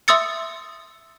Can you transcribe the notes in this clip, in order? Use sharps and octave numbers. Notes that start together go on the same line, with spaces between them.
E5 C6 D#6 E6 A6 C#7